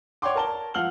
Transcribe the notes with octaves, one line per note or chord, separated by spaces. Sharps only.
C#5 D5 F#5 G5 C6 D6
A#4 A5 G7
F3 F5 F#5 F6 F#7 G7